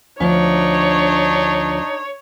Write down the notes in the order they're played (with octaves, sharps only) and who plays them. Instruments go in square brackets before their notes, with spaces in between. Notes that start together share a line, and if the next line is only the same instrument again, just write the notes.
[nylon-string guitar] D2 F3 [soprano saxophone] D4 [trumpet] D#4 [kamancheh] C#5